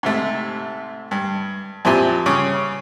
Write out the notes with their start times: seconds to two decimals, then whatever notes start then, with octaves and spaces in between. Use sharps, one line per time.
0.03 G#2 C3 A3
1.11 G2
1.85 F2 A#2 C4 E4 G4 G#5
2.26 G2 C#3 C#4 C#6 D6